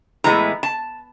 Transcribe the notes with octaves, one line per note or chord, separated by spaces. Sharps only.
A2 E3 G#3 B3 A#5
A5